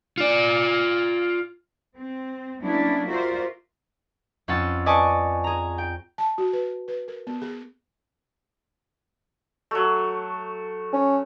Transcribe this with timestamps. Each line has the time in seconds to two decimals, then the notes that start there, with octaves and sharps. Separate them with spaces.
0.18 F4 D5
1.97 C4
2.62 F#3 A#3 B3 C#4 D4 E4
3.08 F4 F#4 A#4 C5 D5 E5
4.48 F2 C#4 F#5 C6 E6 A6
4.86 B4 D5 D#5 G#5 A5 C#6
5.44 G#4 A#5
5.78 G5
6.18 A5
6.38 F#4
6.53 B4
6.88 B4
7.08 A#4
7.27 B3
7.42 G#4
9.71 F#3 A3
10.93 C#4